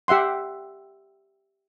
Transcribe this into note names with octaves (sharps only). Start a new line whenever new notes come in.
G4 E5 F#5 C6